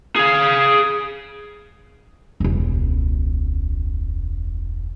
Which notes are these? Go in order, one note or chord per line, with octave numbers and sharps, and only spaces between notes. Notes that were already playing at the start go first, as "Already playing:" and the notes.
G#4 F5
E1 C#2